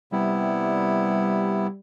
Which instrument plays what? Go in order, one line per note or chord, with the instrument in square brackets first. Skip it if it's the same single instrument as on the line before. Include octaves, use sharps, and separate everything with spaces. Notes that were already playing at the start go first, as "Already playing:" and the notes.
[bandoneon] C3 B3 E4 [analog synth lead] G3